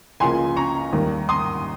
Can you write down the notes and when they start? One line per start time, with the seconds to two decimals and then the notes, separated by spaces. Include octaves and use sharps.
0.20 C#2 C#3 F3 A#3 G#5 C6
0.56 A#5 C#6
0.93 D#2 D#3 G3 A#3
1.29 C6 D#6